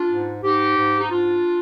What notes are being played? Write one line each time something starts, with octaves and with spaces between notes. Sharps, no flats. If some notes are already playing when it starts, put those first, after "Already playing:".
Already playing: D4 F4
G#2
G#2 D#4 G4
G#2
D#4
G#2 D4 F4